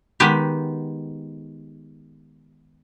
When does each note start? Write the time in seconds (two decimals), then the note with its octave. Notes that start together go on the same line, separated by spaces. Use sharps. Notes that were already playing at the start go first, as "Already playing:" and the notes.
0.20 D#3 G#3 B3 G4